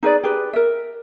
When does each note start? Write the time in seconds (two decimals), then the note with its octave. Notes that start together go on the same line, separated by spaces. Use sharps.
0.03 D#4 G#4 B4 D5
0.23 G4 G#4 B4
0.53 A#4 E5